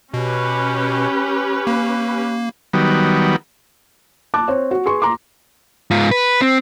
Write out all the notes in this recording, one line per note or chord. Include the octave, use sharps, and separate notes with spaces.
B2 C#4 G4 B4
A#3
D#3 F#3 G3 B3
A5 D6 F#6
C4 C#5
F#4
G#4 B4 C6 C#6
A#5 C6 D6
G#2 F4
B4
C4